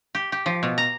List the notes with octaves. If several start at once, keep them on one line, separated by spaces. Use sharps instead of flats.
G4
G4
F3
B2
A#5